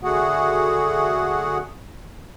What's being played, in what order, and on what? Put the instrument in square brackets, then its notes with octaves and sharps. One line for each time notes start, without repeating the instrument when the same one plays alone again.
[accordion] D3 A3 F#4 G#4 F#5